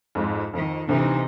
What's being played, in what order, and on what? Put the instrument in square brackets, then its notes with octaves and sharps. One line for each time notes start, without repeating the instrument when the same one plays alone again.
[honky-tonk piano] F2 G#2
[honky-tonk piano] F2 [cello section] D#3
[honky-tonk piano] D2 [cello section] C3 E3 D#4